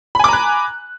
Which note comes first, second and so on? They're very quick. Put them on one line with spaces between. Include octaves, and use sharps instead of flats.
B5 G#5 D6 A#5 F#6